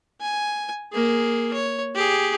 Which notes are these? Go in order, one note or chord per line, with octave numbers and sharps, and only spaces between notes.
G#5
A#3 G#4
C#5
G4 G#4